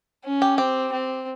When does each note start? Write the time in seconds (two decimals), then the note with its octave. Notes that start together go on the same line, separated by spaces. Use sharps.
0.25 C#4
0.42 G4
0.58 C4 G4
0.92 C4